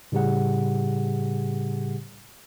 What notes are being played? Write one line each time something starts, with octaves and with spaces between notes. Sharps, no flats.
A2 C#3 G3 G4 G#4 F#5